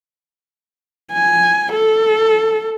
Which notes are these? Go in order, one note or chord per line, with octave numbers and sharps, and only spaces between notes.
G#5
A4